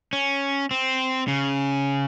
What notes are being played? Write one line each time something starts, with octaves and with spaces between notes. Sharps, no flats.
C#4
C4
C#3